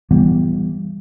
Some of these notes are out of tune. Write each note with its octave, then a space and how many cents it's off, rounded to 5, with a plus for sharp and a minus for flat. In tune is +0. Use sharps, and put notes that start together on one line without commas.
E3 +25 G3 +10 B3 +0